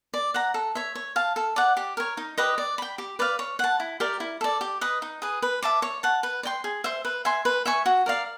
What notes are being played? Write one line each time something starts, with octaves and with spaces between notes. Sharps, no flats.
D5
F#5 A#5
A4
C#5 E5
C#5
F5 A5
A4
D5 F#5
G4
A#4 C#5
D#4
G4 B4 D#5
D5
G5 B5
G4
B4 D5 F5
C#5
F#5 A5
E4
G4 A#4 D5
E4
A4 D5
G4
B4 D#5
D#4
G#4 B4
B4
E5 A5 D6
C#5
F#5 A5
B4
D5 G5 C6
G#4
C5 E5
B4
E5 G#5 C6
B4
E5 G#5 C#6
F#4
A#4 D5 F5